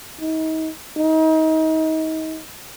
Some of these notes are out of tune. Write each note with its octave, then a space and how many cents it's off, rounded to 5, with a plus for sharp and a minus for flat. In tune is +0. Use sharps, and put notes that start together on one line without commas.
D#4 +35
D#4 +30